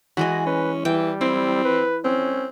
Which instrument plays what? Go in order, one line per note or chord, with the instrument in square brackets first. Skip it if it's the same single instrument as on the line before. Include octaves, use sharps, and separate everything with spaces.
[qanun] E3 G#3 D#5 [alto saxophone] F#4
[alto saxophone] C#4 [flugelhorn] B4
[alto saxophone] E3 [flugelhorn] G3 [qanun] G5
[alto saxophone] C4 [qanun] E4
[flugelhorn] B4
[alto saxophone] C4 [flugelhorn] C#4